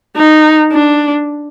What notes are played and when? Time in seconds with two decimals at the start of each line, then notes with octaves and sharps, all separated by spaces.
0.17 D#4
0.72 D4